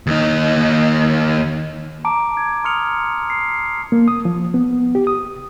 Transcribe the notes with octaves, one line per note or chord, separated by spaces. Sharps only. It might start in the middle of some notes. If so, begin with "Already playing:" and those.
D#2 D#4
A5 A#5 D6 D7
G#6
C6 D#6 F6 C#7 F7
C7
A#3
D#6
F3
B3
G4
D#6